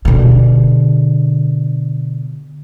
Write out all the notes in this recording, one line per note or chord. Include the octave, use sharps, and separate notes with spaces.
B2 D3